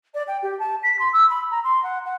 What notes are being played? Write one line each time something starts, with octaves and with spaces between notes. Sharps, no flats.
D5
G5
G4
A5
B6
C6
E6
B5
A#5
C6
F#5
F#5